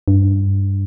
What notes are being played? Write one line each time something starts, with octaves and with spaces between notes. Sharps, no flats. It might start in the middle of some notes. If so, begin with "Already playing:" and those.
G2